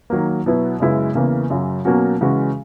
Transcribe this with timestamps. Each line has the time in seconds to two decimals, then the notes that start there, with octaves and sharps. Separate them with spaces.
0.10 D#3 F#3 A#3
0.46 B2 F#3 B3 E4
0.80 F#2 C#3 G#3 B3 E4
1.15 E2 C#3 E3 A#3
1.50 F#2 C#3 F#3
1.85 B2 F#3 A#3 C#4 F#4
2.21 C#3 E3 G#3 C#4 F#4